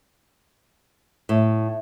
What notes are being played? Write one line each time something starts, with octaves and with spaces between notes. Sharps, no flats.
A2